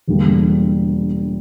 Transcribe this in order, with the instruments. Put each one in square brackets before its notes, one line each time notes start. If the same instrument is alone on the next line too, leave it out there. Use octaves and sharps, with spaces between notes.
[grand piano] E1 E2 D3 G3 A#3